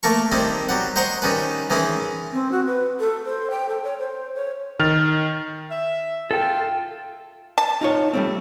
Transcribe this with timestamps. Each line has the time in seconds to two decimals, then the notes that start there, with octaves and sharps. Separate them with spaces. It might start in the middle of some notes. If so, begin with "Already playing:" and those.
0.03 A3 A#3 A4 A#4 C#6
0.32 D#3 G3 C4 E4
0.69 F#3 G3 F#5
0.96 C5 D#5 F#5 A#5 C6 C#6
1.22 D#3 G3 C#4 B4
1.70 D#3 E3 G#3 C#4 E4
2.33 C4
2.52 F#4
2.67 B4
3.00 A4
3.25 C5
3.51 G5
3.69 A4
3.84 C#5
3.99 C5
4.35 C#5
4.79 D#3 F6 A6 F7
5.71 E5
6.31 F4 A4 G5
7.58 A5
7.81 D#4 F4 C#5
8.13 G3 A3 C4